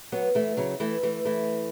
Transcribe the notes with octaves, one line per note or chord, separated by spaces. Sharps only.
F#3 B3
E3 A3
C#3 F#3
E3 A3
E3 A3
E3 A3